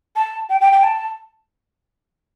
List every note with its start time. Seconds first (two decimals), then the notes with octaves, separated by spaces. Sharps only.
0.16 A5
0.49 G5
0.61 G5
0.72 G5
0.84 A5